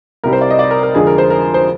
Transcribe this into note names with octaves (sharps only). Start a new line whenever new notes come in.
C2 C3 G3 A#4
C5
D5
D#5
D5
A#4
A#4
F2 D3 F3 G#3 G#4
A#4
C5
A#4
C5